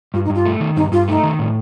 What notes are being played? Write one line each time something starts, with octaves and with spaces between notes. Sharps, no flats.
G2 F4
D#4
G2
F4
A3
D#3
G2 D#4
G2 F4
A3 D#4
D#3
A2